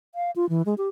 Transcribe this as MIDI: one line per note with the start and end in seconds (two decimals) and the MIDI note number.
0.15 0.31 77
0.36 0.48 65
0.49 0.62 52
0.66 0.74 56
0.78 0.89 67